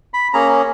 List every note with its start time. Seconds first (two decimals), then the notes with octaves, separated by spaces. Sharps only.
0.14 B5
0.33 A#3 C#4 G#4 A#5